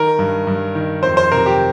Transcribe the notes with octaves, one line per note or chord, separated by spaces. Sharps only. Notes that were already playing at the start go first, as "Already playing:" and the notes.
Already playing: D#3 A#4
G2
G2
D#3
F2 C5
C5
C3 A#4
G4